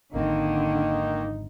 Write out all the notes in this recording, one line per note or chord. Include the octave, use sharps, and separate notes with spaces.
G#1 F2 D3 D#3 A#3 C4 D#4